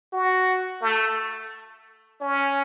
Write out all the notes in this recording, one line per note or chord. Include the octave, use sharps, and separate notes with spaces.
F#4
A3
C#4